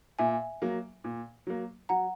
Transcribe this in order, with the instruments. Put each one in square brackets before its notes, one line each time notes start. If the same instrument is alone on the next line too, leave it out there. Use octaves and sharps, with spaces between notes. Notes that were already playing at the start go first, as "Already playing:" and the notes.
[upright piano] A#2 [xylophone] E5 G#5
[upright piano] F#3 A#3
A#2
F#3 A#3
[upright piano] F#3 [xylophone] F#5 A#5